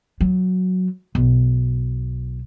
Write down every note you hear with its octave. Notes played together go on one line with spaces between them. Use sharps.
F#3
B1